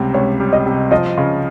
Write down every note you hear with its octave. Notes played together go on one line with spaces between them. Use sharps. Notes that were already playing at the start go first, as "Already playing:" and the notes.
Already playing: C#2 C3 G3
C#2 C#5
G3
D#5
C3
F3 D#5
C#3